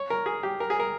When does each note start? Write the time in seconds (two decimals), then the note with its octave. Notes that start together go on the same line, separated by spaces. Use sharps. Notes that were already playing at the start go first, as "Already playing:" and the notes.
Already playing: C#5
0.10 A#4
0.26 G#4
0.43 G4
0.60 A#4
0.70 G#4
0.80 A#4